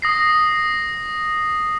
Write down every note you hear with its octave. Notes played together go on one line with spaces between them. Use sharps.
D#6 A#6 C7